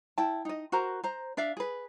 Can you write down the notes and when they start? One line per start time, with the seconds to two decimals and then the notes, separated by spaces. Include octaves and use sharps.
0.18 E4 G5 A5
0.45 D#4 D#5
0.72 F#4 A#4 C5 A#5
1.03 C5 A#5
1.37 D4 D5 E5 F5
1.57 G#4 B4